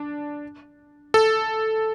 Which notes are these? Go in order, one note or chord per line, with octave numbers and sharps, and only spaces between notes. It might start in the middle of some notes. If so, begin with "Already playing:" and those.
Already playing: D4
A4